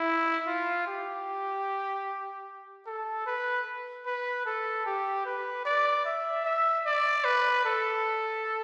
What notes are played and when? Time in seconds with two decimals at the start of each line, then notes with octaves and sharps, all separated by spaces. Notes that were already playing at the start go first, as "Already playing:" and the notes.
Already playing: E4
0.47 F4
0.87 G4
2.86 A4
3.26 B4
4.06 B4
4.46 A4
4.85 G4
5.25 B4
5.65 D5
6.05 E5
6.45 E5
6.86 D5
7.24 B4
7.65 A4